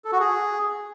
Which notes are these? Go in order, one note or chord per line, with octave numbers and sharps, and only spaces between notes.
A4
F#4
G#4